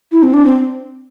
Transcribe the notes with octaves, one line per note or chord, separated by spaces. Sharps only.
E4
C4
D4
C4